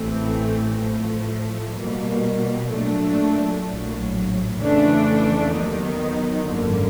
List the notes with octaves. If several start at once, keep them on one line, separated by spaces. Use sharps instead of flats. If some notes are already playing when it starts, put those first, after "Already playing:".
Already playing: A1 A2 E3 A3 C4
A2 F3 A3
B2 G3 A#3
A#2 F#3 A3 D4
A#1 A2 F#3
F2 C#3 E3 A3 D4
D#2 D#3 F#3 B3 D#4
G#1 F#2 D3 F3 A#3